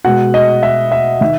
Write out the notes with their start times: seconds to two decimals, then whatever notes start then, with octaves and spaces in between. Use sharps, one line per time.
0.04 B2 G#3 F#5
0.34 D#5
0.63 E5
0.92 E5
1.21 D#3 E5